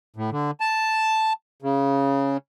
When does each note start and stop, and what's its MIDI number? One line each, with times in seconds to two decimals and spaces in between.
0.16 0.30 45
0.31 0.51 50
0.60 1.33 81
1.62 2.37 49